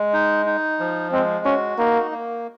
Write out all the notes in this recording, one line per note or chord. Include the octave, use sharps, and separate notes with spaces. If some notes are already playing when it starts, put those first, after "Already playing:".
Already playing: G#3
D#4
D#4
F3
G#3 C4
C#4 F#4
A#3 D#4
A#3